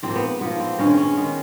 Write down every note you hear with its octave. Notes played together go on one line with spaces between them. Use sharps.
G#2 F3 A#3 C4
B3
G#2 F3 A#3 B3
C4
G2 D#3 G#3 B3 C#4
C#4
D#3 G#3 B3